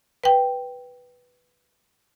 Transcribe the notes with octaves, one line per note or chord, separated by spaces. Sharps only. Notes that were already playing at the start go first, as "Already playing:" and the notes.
B4 G5